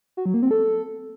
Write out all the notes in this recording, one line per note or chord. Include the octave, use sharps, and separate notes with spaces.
F#4
F#3
A#3
C4
A4